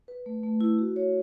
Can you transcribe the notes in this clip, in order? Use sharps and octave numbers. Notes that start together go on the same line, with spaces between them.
B4
A3
A3
E4
F#4
C#5